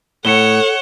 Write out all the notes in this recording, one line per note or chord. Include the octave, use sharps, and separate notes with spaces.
A2 A3 A4 C#5 F#5 C#7 E7 G7